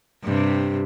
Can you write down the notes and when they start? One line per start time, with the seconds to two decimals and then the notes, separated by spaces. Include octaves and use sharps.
0.24 G2 C3